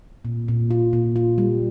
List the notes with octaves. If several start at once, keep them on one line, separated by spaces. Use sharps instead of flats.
A#2
A#2
F4
A#2
F4
G3